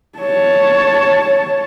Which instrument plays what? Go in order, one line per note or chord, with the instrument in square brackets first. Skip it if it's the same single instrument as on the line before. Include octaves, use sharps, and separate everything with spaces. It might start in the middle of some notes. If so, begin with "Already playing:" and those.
[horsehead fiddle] C#5 A5